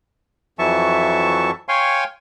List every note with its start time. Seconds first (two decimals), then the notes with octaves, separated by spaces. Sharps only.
0.59 F2 E3 F#3 E5 A5 C#6
1.69 C#5 F5 G5 G#5 C6 C#6